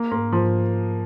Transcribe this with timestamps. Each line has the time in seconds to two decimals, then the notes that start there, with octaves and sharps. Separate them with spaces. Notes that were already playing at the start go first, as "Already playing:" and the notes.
Already playing: A#3
0.11 G#2 A#3
0.33 G#2 F3